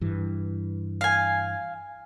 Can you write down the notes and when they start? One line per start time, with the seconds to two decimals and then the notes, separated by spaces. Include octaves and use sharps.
0.01 G2 E3
1.01 F5 G#5